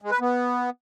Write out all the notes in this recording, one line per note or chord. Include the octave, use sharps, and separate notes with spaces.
G#3
B4
B3